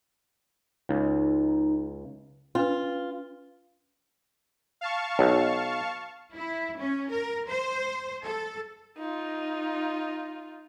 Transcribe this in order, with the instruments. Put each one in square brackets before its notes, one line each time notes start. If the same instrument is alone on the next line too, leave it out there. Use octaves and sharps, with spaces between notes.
[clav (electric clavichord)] C#2 [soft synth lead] D#4
[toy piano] C#4 D4 B4 [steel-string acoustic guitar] F4
[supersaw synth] F5 A5 C#6
[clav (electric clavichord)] B1
[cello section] E4
C#4
A#4
C5
A4
[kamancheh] D#4 F4